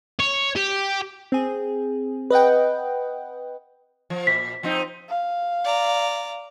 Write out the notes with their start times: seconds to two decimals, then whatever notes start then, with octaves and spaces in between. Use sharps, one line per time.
0.20 C#5
0.56 G4
1.32 C4 G#4
2.30 B4 D#5 F#5 G5
4.10 F3
4.27 A#2 B6
4.63 F3 C4 D#4
5.09 F5
5.64 D5 A#5